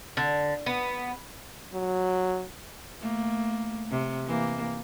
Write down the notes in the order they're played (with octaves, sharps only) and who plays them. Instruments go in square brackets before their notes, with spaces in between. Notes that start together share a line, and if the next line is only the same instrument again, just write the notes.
[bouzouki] D3
B3
[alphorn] F#3
[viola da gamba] A3 A#3
C3
E3 A#3